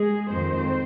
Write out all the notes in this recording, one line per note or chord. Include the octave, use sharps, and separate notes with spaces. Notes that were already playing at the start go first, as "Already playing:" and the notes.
Already playing: G#3 G#4
F2 D#3 G#3 C4 C5